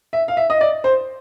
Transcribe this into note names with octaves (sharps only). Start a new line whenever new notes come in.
E5
F5
E5
D#5
D5
C5